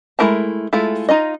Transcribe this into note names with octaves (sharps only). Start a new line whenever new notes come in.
G#3 A3 E4 A#4 A5
G#3 A3 E4 F4 A4
D#4 F4 D#5